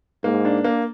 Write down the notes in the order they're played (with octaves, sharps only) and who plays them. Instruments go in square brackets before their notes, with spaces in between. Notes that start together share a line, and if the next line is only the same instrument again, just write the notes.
[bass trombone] G#2 [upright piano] A#3
[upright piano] D4
A#3